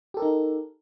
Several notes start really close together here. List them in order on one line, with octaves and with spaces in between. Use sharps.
G4 A4 A#4 D#4